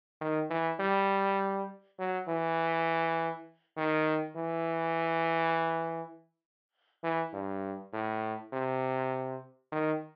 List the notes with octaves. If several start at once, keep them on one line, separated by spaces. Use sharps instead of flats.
D#3
E3
G3
F#3
E3
D#3
E3
E3
G2
A2
C3
D#3